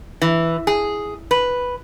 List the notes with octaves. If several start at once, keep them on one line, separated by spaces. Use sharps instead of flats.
E3
G#4
B4